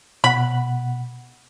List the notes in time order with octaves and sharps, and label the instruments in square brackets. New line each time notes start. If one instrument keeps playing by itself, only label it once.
[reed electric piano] B2 F#5 [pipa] B5